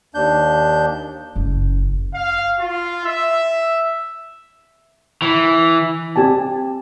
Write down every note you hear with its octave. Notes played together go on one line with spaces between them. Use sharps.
D#2 D4 G6
F#1
F5
F4
E5
E3
C4 G4 G#5 A5